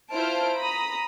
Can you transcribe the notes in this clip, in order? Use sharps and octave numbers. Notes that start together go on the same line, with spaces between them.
E4 F4 C5 A5 F6 D7
A#5 B5 D#6